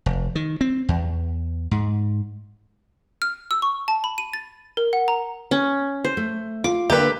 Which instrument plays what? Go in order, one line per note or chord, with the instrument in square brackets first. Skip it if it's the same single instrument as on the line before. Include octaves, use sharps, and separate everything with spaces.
[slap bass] F1
D#3
C4
E2
G#2
[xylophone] F6
E6
C#6
A5
B5
D#7
A6
A#4
F#5
A#5
[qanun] C#4
C5
[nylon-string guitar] A3
[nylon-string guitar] F4 [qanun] D6
[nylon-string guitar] D3 A#3 [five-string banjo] G4 B4